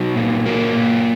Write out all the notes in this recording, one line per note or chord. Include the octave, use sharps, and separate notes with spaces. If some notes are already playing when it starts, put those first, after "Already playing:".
Already playing: F#3 D#4
A#2
F#3 A#3
A#2